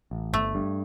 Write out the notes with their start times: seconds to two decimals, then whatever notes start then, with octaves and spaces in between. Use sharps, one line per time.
0.11 A1
0.33 G1 A3
0.55 G2